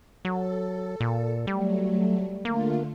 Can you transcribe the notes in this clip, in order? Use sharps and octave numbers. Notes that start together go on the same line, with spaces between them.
F#3 A4
A#2
F#3 G3 A3
D3 A3 A#3 F4